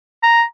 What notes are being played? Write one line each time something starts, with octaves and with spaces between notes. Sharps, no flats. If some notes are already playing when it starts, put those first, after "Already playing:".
A#5